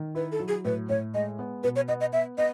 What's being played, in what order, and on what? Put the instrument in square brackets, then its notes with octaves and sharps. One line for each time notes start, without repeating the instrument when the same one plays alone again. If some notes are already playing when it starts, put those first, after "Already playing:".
Already playing: [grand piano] D#3
[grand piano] E4 [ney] B4
[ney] A4
[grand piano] F#3
[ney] G#4
[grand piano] A2 [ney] B4
[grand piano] A2 [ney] C#5
[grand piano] G#3 [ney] D#5
[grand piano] B3
[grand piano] B2 [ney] B4
[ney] C#5
[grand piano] B3 [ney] D#5
[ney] D#5
[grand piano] B3 [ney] E5
[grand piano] B3 [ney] D#5